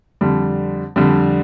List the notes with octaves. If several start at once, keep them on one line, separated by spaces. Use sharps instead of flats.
F2 D3 G3
F2 D3 G3